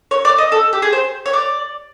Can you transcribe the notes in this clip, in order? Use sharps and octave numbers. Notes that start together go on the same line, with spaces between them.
C#5
D5
D#5
A4
G4
G#4
C5
C#5
D5